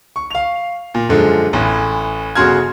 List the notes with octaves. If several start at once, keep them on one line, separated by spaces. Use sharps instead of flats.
C#6
F5 F7
A#2
F#2 D3 F3 G#3
A1 A2 E3
G1 C#3 F#4 C6 F6 G#6